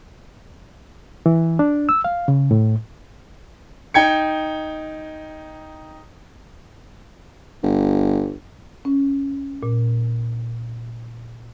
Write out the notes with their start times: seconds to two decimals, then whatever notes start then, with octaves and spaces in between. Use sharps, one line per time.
1.26 E3
1.59 D4
1.89 E6
2.04 F5
2.28 C#3
2.51 A2
3.94 D#4 G5 G#6 C#7
7.63 G1
8.85 C#4
9.63 A#2